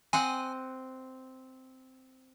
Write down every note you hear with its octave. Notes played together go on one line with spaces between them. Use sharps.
C4 D#5 F#5 G#5